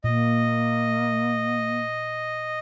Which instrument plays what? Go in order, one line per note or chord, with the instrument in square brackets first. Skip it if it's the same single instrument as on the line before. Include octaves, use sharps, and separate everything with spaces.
[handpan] A#2 [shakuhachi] A#3 [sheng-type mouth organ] D#5